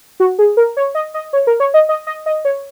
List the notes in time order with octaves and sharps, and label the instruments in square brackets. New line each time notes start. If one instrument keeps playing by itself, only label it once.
[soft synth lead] F#4
G#4
A#4
C#5
D#5
D#5
C#5
A#4
C#5
D#5
D#5
D#5
D#5
C#5